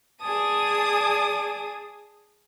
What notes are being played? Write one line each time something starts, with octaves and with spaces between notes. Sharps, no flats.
G#4 D5 G#5 A5 D#6